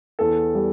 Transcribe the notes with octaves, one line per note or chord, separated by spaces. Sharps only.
E2 A4
G3